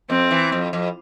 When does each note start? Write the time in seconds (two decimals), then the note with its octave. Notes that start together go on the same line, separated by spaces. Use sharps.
0.10 F2 C4
0.31 E3
0.52 F2
0.73 F2